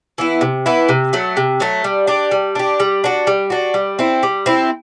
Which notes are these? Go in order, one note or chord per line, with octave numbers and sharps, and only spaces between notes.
E3 B3 E4
C3
E3 B3 E4
C3
F#3 A3
C3
F#3 A3
G3
D4 G4
G3
D4 G4
G3
D4 F#4
G3
D4 F#4
G3
C4 E4
G3
C4 E4